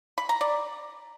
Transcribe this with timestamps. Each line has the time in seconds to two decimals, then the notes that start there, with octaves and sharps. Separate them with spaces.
0.18 B5
0.29 A#5
0.41 D5